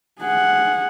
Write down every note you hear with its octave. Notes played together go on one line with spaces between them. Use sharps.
G#4 F#5